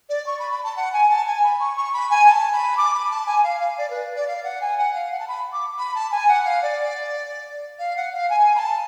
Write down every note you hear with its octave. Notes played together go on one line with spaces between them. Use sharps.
D5
C#6
B5
B5
A5
F#5
G#5
A5
G#5
B5
C#6
C#6
B5
G#5
A5
B5
D6
B5
A5
G#5
F5
F5
D5
B4
D5
F5
F#5
G#5
F#5
F5
F#5
A5
B5
D6
B5
A5
G#5
F#5
F5
D5
F5
F#5
F5
G#5
B5
A5